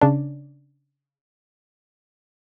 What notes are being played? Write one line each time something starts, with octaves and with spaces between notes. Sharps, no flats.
C#3 D4